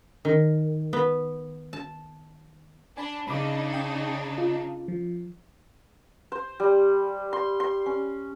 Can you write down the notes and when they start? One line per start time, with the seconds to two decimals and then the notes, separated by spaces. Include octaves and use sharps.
0.25 D#3
0.93 B3
1.73 A5
2.97 D4 G#5 B5
3.28 C#3 D4 D#4 B5 D6
3.74 G5 D#6
4.38 F4
4.88 F3
6.32 C5
6.60 G3
7.33 C6
7.60 C6
7.86 C#4